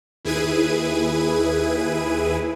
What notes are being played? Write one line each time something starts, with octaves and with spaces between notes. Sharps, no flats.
D#2 E4 G#4 B4 G#6 D#7